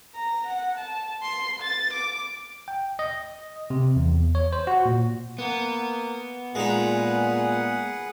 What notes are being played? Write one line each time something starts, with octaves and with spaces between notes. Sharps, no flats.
A#5
F#5
A5
C6
A6
D6
G5
D#5
C3
E2
C#5
C5
F#4
A#2
A#3 B3
A#2 G#3 D#4 G#4 B4 F#5